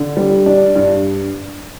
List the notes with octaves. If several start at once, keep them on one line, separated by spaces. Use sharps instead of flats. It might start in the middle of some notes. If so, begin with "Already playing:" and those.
Already playing: D3
G3
D4
G2